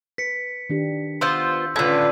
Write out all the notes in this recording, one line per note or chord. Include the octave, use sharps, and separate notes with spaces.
B4 B6 C#7
D#3 D4 G4
B3 F4 C5 C6 E6 G6
A2 D3 C#4 F4 B4 E6 G#6